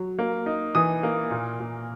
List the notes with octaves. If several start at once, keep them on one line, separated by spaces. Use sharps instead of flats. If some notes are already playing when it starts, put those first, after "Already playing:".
Already playing: F#3
A#3
D#4
E3 D#6
A#3
A#2
A#2